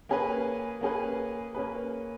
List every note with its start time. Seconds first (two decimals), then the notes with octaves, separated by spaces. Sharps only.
0.09 A#3 C#4 G#4 B4
0.81 A#3 C#4 G#4 B4
1.55 A#3 C#4 G#4 B4